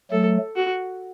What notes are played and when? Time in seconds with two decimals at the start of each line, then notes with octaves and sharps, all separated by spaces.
0.12 F#3 A3 A4
0.56 F#4